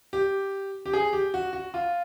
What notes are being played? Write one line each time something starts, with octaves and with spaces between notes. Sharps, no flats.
G4
G4
G#4
G4
F#4
F#4
F4